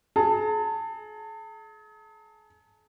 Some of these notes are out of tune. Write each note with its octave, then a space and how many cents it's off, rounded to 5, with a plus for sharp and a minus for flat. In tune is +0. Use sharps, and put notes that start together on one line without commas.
G#4 +40 A5 +35